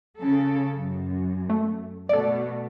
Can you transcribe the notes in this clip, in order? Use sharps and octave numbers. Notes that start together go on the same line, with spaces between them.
C#3 A4
F#2
A3
B2 A3 A4 D5